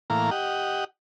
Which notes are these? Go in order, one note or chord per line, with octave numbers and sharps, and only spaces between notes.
A2 E3 A#3 F5 A#5
G4 D#5 F#5